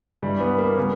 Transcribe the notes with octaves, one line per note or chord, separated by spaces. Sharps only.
G2 E3 G3
B3
A#3
C#3 G3 B3